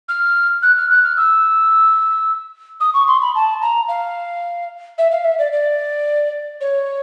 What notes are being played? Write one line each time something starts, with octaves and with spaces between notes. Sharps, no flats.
F6
F#6
F6
F#6
F6
E6
D#6
C#6
C6
B5
A5
A#5
F5
E5
F5
E5
D5
D5
C#5